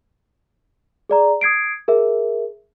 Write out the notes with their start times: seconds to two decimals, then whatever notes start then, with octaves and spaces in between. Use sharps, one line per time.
1.09 G#4 D5 A#5
1.41 D#6 G#6 C7 D7
1.88 G#4 A#4 E5